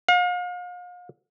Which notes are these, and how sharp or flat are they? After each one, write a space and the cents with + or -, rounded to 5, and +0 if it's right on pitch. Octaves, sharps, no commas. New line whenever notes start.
F5 +40